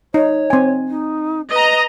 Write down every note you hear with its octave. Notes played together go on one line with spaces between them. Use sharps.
D#4 C#5
C4 G#5
D#4
B4 D#5 A#5